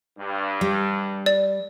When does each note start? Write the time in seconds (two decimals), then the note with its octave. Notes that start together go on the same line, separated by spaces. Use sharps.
0.19 G2
0.61 G3
1.26 D5